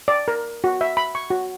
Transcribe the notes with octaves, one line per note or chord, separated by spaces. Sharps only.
D5
A#4
F#4
E5
B5
C#6
F#4